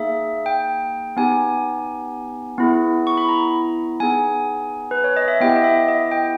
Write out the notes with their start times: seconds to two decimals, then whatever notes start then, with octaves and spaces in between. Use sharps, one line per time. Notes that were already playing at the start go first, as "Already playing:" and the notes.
Already playing: A#3 D#4 G#4 E5
0.46 G5
1.17 B3 D#4 G4 G#5
2.58 B3 E4 G#4
3.07 C#6
3.17 B5
3.29 A#5
4.00 B3 D#4 G#4 G#5
4.91 B4
5.04 C#5
5.17 D#5
5.28 E5
5.40 B3 E4 G4 G5
5.56 D#5
5.64 E5
5.88 D#5
6.11 G5